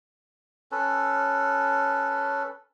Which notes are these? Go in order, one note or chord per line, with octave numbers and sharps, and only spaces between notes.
C#4 A4 B4